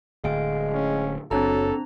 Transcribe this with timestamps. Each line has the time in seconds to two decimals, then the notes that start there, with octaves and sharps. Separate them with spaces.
0.24 D1 D2 G#3 F5 G5 D7
0.74 C#4
1.31 F#1 F#3 C4 D4 A4 A#5